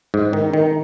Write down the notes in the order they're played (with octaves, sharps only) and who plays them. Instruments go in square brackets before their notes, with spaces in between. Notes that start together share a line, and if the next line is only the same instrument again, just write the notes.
[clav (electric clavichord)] G#2
D#3
D#3